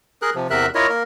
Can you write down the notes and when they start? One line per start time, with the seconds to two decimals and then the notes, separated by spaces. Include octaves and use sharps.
0.22 G#4 A#4 F#6
0.35 C3 F3
0.50 E2 C3 A#4 E5 F#6
0.75 E4 F4 A#4 C#5 D#5
0.89 A#3 A#4